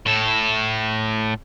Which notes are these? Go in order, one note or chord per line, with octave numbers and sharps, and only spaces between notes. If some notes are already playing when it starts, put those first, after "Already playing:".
A2 A4